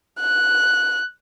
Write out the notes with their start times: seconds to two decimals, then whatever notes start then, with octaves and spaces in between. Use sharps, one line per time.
0.20 F#6